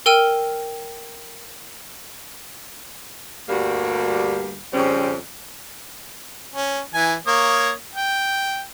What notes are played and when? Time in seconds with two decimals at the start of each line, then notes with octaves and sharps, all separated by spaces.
0.06 A#4 G5 E6 F6 D#7
3.49 D2 G2 G3 A#3 F#4
4.73 F2 C#3 G3 C4 C#4
6.55 C#4
6.94 E3 G#5
7.27 A#3 C#5 D#6
7.95 G5